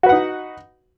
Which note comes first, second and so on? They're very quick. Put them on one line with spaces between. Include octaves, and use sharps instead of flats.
F#4 B4 F#5 D#4